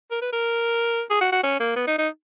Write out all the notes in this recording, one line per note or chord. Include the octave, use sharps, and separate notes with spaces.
A#4
B4
A#4
G#4
F#4
F#4
C#4
A#3
B3
D#4
D#4